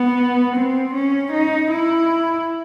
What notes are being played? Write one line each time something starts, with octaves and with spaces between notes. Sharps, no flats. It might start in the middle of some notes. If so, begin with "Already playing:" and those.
Already playing: B3
C4
C#4
D#4
E4